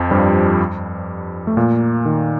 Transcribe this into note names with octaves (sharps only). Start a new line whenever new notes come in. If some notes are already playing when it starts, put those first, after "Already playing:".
Already playing: F2 F3
G2 G3
A3
A#2 A#3
D#3